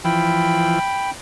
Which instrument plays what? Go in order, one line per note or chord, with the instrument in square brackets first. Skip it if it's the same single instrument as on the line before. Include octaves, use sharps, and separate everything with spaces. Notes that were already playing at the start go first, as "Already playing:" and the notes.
[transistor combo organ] E3 F3 [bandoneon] G5 B5